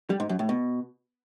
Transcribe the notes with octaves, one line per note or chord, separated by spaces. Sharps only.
G3
G#2
F#2
A2
B2